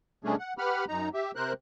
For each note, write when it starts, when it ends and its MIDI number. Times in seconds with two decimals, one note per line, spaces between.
0.24 0.36 47
0.24 0.36 55
0.24 0.36 57
0.24 0.36 61
0.24 0.36 62
0.24 0.36 68
0.39 0.53 78
0.58 0.85 67
0.58 0.85 71
0.58 0.85 78
0.58 0.85 83
0.58 0.85 89
0.88 1.09 42
0.88 1.09 63
0.88 1.09 82
1.14 1.31 67
1.14 1.31 76
1.36 1.53 48
1.36 1.53 70
1.36 1.53 72
1.36 1.53 90